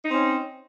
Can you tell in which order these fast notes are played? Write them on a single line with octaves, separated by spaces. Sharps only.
D#4 C4 C#4